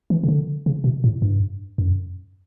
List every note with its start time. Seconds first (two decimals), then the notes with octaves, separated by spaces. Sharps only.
0.10 E3
0.24 C#3
0.29 D3
0.66 C#3
0.84 B2
1.04 A2
1.22 G2
1.78 F#2